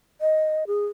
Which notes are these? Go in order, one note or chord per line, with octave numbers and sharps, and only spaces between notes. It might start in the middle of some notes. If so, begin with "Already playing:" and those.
D#5
G#4